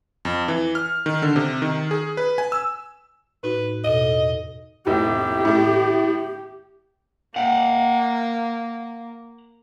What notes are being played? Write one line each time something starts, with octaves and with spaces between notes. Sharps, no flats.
F2
E3
F6
D#3
D3
C3
D#3
G#4
B4
G#5
E6
A2 D#4 F#4 B4
E2 B2 A4 D#5
F1 A2 G4
A2 A3
A#3 F5 F#5